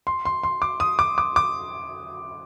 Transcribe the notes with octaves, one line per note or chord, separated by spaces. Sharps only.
C6
C6
C6
D6
D#6
D6
D6
D6